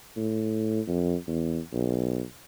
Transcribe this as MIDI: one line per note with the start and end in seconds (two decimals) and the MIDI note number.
0.16 0.80 45
0.87 1.15 41
1.27 1.59 40
1.73 2.21 35